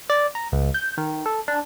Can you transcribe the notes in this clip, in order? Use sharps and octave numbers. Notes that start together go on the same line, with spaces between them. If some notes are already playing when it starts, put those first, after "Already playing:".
D5
A#5
C#2
G6
D#3
A4
D4